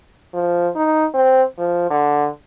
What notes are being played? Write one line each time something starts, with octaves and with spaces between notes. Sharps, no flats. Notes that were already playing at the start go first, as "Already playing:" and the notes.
F3
D#4
C4
F3
D3